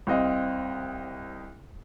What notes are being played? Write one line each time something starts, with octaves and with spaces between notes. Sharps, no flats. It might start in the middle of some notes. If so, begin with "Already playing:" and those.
C2 C4 D#5 F5